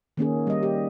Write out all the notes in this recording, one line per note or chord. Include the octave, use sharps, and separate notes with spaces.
D#3 A#3 C#4 G#4
G3 D#5
G4